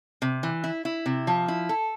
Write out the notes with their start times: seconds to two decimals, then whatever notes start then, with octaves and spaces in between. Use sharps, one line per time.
0.22 C3
0.43 E3
0.64 E4
0.85 E4
1.06 C3
1.27 F3
1.48 E4
1.69 A4